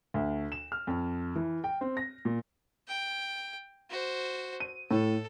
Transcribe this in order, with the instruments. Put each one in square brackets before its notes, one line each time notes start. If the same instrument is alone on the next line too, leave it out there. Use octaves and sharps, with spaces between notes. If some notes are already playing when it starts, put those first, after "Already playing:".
[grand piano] D2
E7
F6
F2
E3
G5
C4
A#6
A#2
[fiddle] G5
F#4 C5
[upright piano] D#7
[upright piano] A2 [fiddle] A4